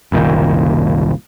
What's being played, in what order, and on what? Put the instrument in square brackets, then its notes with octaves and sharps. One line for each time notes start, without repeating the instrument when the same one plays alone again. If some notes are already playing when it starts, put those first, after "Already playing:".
[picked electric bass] F#1 C2 A#2 D#3